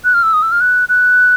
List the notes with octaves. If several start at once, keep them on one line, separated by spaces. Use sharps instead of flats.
F#6
F6
E6
D#6
E6
F6
F#6
F#6